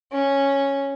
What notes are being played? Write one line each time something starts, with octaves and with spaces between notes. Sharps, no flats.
C#4